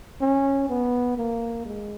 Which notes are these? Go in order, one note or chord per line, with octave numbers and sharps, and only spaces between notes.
C#4
B3
A#3
G#3